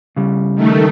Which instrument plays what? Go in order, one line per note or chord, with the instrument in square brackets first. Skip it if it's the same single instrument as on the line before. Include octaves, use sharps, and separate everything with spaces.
[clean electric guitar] C#3 G3
[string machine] D#3 A3